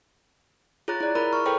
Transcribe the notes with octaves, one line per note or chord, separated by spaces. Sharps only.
F4 G#4 C#5 A#5 F#6 A6
E4 D5
E4 G#4 A#4 A#5 B5
C#6 F6
G#4 A4 B4 C#5 G5